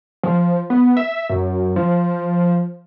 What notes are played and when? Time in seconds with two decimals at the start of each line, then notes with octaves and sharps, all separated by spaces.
0.23 F3
0.70 B3
0.97 E5
1.30 F#2
1.76 F3